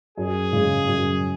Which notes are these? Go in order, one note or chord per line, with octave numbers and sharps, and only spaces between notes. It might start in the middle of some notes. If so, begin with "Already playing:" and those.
F#2 G#4
C#3 G#3
F#2